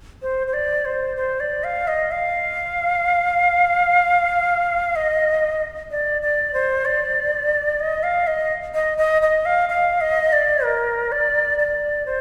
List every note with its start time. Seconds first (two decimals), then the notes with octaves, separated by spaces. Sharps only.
0.22 C5
0.47 C5
0.53 D5
0.85 C5
1.16 C5
1.40 D5
1.64 F5
1.87 D#5
2.11 F5
4.96 D#5
5.91 D5
6.22 D5
6.53 C5
6.85 D5
7.80 D#5
8.03 F5
8.27 D#5
8.74 D#5
8.98 D#5
9.22 D#5
9.45 F5
9.69 F5
10.01 D#5
10.32 D5
10.64 A#4
11.12 D5
11.59 D5
12.06 C5